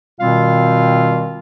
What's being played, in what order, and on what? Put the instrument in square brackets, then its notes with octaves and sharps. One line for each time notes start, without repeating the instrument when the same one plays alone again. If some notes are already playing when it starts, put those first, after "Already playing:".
[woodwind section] B2 D#3 G3 C4 F4 F5